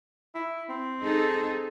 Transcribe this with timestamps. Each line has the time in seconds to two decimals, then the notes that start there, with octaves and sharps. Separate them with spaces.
0.35 E4
0.69 C4
1.01 D#4 G#4 A4